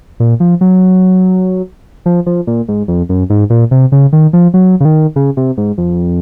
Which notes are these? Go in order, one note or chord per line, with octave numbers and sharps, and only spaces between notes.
A#2
F3
F#3
F3
F3
A#2
G#2
F2
F#2
G#2
A#2
C3
C#3
D#3
F3
F#3
C#3
D#3
C#3
C3
G#2
F2